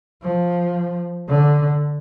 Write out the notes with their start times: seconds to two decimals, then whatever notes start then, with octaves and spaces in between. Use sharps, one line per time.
0.22 F3
1.28 D3